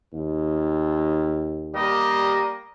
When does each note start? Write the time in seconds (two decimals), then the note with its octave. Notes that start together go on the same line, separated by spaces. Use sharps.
0.13 D#2
1.74 G3 A#3 G4 D#5